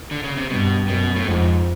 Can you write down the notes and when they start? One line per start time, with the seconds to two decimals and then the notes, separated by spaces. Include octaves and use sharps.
0.11 D3
0.24 C#3
0.37 C3
0.50 G2 B2
0.88 F#2 B2
1.16 A2
1.27 F2 G#2